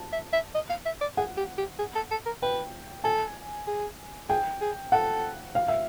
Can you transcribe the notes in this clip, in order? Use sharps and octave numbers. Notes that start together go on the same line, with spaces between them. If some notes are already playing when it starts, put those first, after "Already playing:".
Already playing: A5
E5
E5
D#5
F5
E5
D5
G#4 F#5
G4
G4
G#4
A4
A4
A#4
B4 G5
A4 G#5
G#4
G#4 G5
G#4
A4 F#5
F5
E5